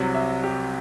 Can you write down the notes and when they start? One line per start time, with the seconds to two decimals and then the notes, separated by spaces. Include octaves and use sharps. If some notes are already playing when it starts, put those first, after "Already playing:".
Already playing: C2 C3 F#3
0.15 E5
0.44 G4